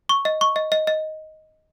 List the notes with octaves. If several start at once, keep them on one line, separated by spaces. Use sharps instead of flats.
C#6
D#5
C#6
D#5
D#5
D#5